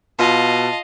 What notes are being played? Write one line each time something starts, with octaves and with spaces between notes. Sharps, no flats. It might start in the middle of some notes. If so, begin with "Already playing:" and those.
B2 F4 D#5 F5 A5